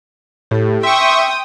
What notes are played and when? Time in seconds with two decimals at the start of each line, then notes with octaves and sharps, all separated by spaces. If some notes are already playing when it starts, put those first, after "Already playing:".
0.51 A2 G4 A4
0.83 E5 G5 C6 C#6 D#6